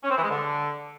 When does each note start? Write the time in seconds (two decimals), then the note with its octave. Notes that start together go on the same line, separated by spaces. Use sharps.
0.04 C#4
0.10 C4
0.17 E3
0.23 G#3
0.30 D3